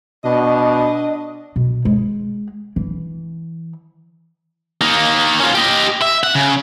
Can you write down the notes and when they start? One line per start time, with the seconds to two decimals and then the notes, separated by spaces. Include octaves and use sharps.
0.25 B2 D4 D#5
1.56 B2
1.85 G#3
2.76 E3
4.82 A#3 D#4
5.40 C#4 F4
5.55 G4 D#5
6.02 E5
6.23 F#5
6.35 C#3